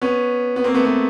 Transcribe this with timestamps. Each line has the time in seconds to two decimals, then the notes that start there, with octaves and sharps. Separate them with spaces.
0.02 B3 C#4
0.56 B3
0.64 A#3 C4
0.74 A3 B3
0.85 A3 B3